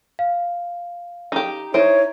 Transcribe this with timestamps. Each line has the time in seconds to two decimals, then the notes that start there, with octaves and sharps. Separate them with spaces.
0.19 F5
1.32 D#4 G4
1.74 D#4 E4 C5 C#5 E5 D7